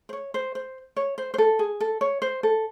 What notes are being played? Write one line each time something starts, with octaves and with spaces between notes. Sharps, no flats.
C5
C#5
C5
C5
C#5
C5
C5
A4
G#4
A4
C#5
C5
A4